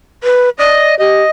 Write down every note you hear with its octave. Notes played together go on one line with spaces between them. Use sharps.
B4
D5 D#5
G4 D#5